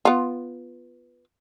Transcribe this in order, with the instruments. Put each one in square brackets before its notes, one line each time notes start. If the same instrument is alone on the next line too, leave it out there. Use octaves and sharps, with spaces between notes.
[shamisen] B3 F4